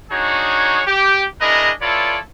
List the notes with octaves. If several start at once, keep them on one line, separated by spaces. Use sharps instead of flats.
D4 D#4 F#4 G#4 C#5
G4
D4 E4 G#4 A#4 B4 D#5
E4 F4 A4 B4 C#5 D5